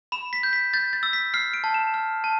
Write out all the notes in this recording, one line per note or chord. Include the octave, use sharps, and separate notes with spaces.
B5 E7
B6
G6
B6
G6 A6
A6
E6
B6
F6 C7
D7
A5
E7
F6
A5